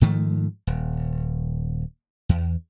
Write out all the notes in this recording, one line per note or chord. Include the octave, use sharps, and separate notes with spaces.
G#2 D#3 F3 A3
D#1
E2